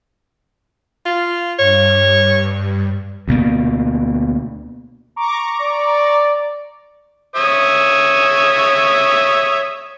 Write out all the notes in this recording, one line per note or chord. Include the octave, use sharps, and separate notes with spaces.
F4
G2 C#5
D2 B2 A#3
A#5 C#6 D6
D5
C#5 E5 D#6